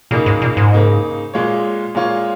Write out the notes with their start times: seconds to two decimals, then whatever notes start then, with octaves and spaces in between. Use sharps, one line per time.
0.11 A#2 C#3 A#3 D#4
0.26 G#2
0.42 A#2
0.57 G#2
0.72 C#3 A#3 D#4
1.34 A#2 G#3 F4 C#5
1.95 A#2 G#3 F4 C#5